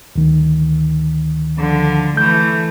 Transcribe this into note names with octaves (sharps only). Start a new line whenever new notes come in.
D2 D#3
D3 F3
E3 A3 G6